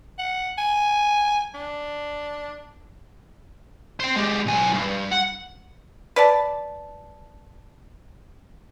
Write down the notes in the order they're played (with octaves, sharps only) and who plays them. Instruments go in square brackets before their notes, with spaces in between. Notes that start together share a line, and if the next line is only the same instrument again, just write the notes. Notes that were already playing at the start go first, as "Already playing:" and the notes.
[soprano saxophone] F#5
G#5
D4
[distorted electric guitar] C5 G5
G#3 G4
B1 G#5
G2
F#5
[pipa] B4 D5 A5